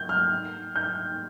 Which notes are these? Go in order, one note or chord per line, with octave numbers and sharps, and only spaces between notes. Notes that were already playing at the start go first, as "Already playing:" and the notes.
Already playing: G6
F6
G6